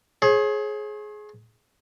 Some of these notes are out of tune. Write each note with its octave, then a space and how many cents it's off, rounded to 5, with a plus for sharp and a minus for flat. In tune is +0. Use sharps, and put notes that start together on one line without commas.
G#4 +20 C#5 -45